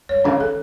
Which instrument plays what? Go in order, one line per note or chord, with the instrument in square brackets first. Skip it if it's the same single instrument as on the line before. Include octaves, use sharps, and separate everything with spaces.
[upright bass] G2 [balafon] C#5
[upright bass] C#3 [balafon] C#4
[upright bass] D#3 [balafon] A4